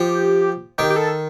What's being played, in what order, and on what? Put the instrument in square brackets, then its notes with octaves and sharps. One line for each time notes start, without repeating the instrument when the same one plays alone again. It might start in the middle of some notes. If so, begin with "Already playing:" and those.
Already playing: [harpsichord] F3 [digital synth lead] G4
[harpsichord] D#3 [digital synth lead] G4
[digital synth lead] G4
A4